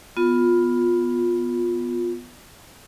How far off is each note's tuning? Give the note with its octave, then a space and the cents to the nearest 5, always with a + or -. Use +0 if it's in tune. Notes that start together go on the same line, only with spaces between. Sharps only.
B3 +0 F4 +15